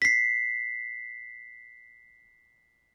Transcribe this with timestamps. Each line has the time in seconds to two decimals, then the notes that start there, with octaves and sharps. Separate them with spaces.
0.02 B6 C7